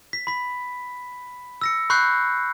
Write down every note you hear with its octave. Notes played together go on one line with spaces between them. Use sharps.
B6
B5 B6
E6 A#6 C#7
B5 C#6 F#6 G6 C7